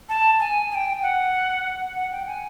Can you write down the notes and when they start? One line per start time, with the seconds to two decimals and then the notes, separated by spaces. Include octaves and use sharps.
0.09 A5
0.40 G#5
0.71 G#5
0.75 G5
1.02 F#5
1.96 F#5
2.12 G5
2.27 G#5